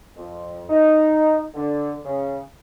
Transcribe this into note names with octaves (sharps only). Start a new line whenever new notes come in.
F2
D#4
D3
C#3